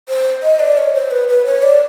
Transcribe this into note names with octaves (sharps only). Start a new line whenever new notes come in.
C5
D#5
D5
C#5
C5
B4
B4
C#5
D5